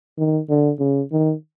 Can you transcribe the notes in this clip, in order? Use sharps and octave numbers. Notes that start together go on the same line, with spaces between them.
D#3
D3
C#3
D#3